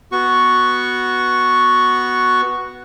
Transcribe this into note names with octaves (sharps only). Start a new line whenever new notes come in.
B3 F#4 C#6